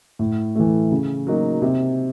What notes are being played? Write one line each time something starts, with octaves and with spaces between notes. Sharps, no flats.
A2
E3 A3
C#3
F#3 A#3 D#4 F#4
C3